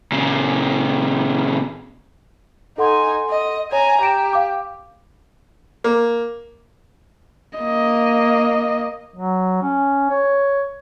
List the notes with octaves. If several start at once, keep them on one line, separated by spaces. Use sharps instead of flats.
A#2 C#3
D#4 A4 F#5 G#5 C6
D#5
C#5 G#5 A#5
G4 A#5 D7 E7
F5 D6
A#3
A#3 D#5
F#3
C#4
C#5